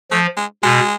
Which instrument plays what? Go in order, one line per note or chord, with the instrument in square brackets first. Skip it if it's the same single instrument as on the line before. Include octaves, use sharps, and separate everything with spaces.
[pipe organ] F3 [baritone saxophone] A3
[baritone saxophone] G#3
[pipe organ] B2 [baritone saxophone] G#3